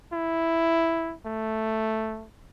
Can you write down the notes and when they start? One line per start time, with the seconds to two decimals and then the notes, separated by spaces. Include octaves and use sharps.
0.13 E4
1.26 A3